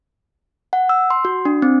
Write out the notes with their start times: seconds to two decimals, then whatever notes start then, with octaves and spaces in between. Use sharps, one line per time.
0.73 F#5
0.89 E6
1.10 C6
1.25 F#4
1.45 D4
1.62 C4